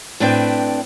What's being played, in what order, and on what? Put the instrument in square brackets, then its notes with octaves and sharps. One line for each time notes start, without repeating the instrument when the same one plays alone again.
[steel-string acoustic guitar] A2 C4 D4 B4 D5 G5